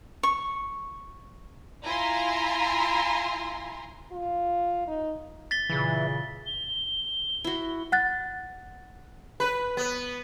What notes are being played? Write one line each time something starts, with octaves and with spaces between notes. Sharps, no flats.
C#6
E4 F4 G#5 A#5 C6
F4
D#4
A6 B6 G7
A#2 C#3 E3
G7
E4 F#4
F#5 F#6 A6
B4
B3